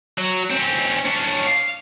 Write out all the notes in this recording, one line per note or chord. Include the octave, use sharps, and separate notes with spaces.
F#3
C4 C#4
C#4 D4
F5